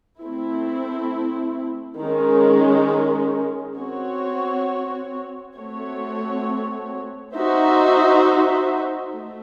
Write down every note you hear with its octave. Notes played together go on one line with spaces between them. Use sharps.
A3 C4 E4
D#3 G#3 C#4
C4 F#4 C#5
A3 C4 F#4 C#5
D#4 F#4 C5 E5
A3